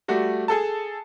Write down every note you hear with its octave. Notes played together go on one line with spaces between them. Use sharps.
G3 A3 F#4
G#4 A4 A5